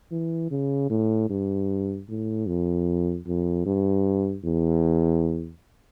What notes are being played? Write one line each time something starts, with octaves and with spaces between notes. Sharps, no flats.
E3
C#3
A2
G2
A2
F2
F2
G2
E2